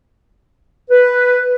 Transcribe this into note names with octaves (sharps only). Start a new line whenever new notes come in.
B4